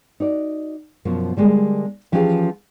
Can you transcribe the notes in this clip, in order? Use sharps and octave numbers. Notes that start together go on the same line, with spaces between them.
D#4 F#4 D5
F#2 B2 F3 A#3
D3 G3 G#3 A#3
E3 F3 C#4 G4 G#4 F5